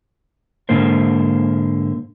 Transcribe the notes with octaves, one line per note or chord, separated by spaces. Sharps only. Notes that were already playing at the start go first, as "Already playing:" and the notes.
G#2 D3 A#3 A#4 C5